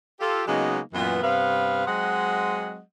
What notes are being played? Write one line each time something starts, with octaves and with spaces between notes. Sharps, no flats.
F4 G4 A4
C#3 F#3 G#3 A#3 B3 D#4
F#2 A#2 E3 B3
G2 C3 B3 B4 F5
F#3 G#3 C4 D#5 F#5